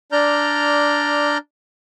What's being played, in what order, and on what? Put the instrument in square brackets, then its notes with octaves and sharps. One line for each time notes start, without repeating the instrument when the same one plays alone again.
[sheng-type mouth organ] D4 D5 A#5 F6 G6